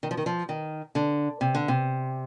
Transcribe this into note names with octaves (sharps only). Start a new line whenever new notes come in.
D#3
F3
D#3
F3
D#3
D3
C3
D3
C3